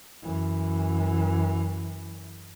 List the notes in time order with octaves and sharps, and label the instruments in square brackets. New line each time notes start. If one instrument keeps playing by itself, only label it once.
[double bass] F#2 E3